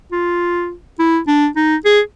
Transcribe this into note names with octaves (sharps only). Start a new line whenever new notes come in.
F4
E4
D4
D#4
G#4